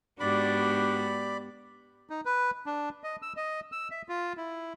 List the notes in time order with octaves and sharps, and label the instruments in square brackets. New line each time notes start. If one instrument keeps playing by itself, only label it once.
[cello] G#2 F#4 [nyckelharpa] B3 G4 [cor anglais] D4 [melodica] D5 B5
[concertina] D#4
B4
D4
D#5
E6
D#5
E6
E5
F4
E4